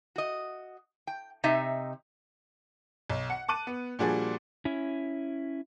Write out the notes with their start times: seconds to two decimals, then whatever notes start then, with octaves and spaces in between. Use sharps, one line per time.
0.16 F#4 D#5
1.07 G5
1.44 C3 D#4 D#5 E5
3.10 B1
3.30 F#5 C#7
3.48 A5 D6 F#6 D#7
3.67 B3
3.99 A#2 F3 G3 D4 F#4 G#4
4.65 C#4 E4